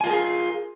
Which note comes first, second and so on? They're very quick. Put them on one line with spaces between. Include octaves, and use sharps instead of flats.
G#5 F4 A#4 G#4